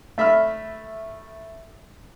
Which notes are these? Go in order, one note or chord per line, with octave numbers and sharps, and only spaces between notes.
A3 E5 B5 F6